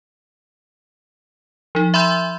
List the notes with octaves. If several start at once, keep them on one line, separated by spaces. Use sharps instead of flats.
F3 D#4
E5 B5 C6 E6 G6